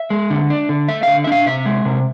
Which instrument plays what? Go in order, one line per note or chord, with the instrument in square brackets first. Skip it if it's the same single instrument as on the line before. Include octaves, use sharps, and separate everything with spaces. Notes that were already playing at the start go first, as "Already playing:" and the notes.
Already playing: [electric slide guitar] E5
G#3
D3
D4
D3
A3 E5
D3 F5
E5
D4 F5
C3 E5
G#3
C3